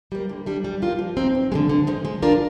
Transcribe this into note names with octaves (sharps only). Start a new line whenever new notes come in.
G3 A#3
D3
G3 D4
G3
A#3 F4
F3
C4 D#4
G2
D3 F3 G#3
D3
F3 G#3
G#3
D4 F4 A#4 D5